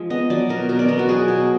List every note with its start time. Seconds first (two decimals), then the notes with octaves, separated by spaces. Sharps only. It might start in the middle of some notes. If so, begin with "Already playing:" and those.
Already playing: F3 G#3 G#4
0.10 B3 D#5
0.30 F#3 D5
0.49 B2 A#4
0.69 B2 A#4
0.79 D5
0.89 B3 A#4
0.99 F#4
1.09 F#3 G#4
1.28 B2